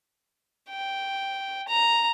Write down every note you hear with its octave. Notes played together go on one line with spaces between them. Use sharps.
G5
A#5